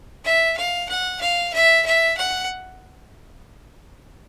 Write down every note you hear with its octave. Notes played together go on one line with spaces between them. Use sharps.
E5
F5
F#5
F5
E5
E5
F#5